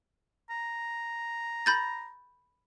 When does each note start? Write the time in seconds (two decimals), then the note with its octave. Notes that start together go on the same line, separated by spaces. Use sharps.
0.50 A#5
1.66 B5 G6 A6